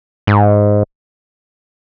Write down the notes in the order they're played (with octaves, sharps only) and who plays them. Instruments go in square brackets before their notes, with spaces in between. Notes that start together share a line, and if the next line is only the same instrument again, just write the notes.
[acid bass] G#2